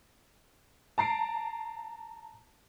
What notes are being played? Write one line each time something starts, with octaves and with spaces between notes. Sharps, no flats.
A5 A#5 C7 D7